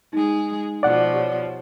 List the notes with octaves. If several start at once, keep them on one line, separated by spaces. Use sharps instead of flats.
G#3 D#4 G#4
B2 F3 D5 F#5
G4 C#5